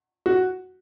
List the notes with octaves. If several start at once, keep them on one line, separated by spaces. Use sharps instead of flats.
F#4